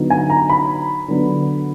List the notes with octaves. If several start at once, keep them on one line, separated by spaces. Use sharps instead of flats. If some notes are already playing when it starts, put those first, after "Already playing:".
Already playing: D3 F#3 B3 D#4
G#5
A#5
B5
D3 F#3 B3 D4